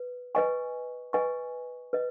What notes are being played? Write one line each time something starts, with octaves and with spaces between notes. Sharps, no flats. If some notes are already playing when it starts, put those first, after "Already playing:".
Already playing: B4
B4 D#5 G#5 C#6
B4 D#5 G#5 C#6
B4 D#5